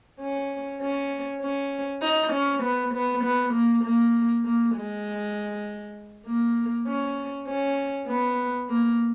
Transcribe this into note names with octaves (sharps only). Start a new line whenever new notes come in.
C#4
C#4
C#4
D#4
C#4
B3
B3
B3
A#3
A#3
A#3
G#3
A#3
C#4
C#4
B3
A#3